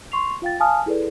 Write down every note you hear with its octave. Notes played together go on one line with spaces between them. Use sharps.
C6 C#6 C7 F7
F4 F5 G5 A6
F5 G#5 A5 D#6 F6
E4 G#4 A4 B4 D5